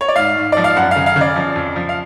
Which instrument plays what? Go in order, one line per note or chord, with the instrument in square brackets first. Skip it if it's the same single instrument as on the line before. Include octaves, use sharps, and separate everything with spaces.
[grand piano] C#5
D5
G#2 F5
G#2
F3 D5
F5
F#2 F#5
C#3 F5
F5
C#3
D5
F3
F2
F3
F5